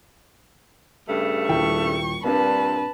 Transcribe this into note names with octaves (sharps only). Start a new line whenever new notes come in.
G2 C#3 A3
D#1 E4 G5 C#6
G2 A#2 C4 D4 B4 A5